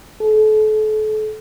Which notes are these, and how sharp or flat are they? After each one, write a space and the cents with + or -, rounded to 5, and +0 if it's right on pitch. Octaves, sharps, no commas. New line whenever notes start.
A4 -35